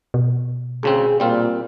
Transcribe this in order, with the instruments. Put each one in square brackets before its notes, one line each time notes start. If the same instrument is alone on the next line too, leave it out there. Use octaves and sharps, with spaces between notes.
[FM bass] B2
[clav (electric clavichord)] D2 C#3 C4 [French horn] G#4
[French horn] A#2 [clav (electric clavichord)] G3 C4 F4